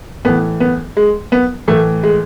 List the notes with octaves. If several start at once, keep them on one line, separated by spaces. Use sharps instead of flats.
A2 E3 B3
B3
G#3
B3
A2 E3 A3
G#3